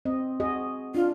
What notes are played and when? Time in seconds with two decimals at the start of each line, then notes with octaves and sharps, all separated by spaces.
0.05 C4 D#5
0.40 F#4 G#4 D#5
0.95 D4 F4